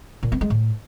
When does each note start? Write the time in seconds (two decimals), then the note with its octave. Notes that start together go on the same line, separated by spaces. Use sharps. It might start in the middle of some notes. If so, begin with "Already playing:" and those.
0.23 A#2
0.32 B3
0.41 G#3
0.50 A2